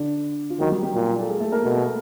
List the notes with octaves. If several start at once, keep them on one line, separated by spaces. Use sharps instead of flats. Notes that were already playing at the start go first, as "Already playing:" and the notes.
Already playing: D3 D4
F4
D#3 F#3 F#4
G3 G4
G3 G4
A#2
A4
G#3 G#4
A3 A4
A#3 A#4
B2 A3 A4